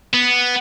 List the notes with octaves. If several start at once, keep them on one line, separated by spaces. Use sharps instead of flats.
B3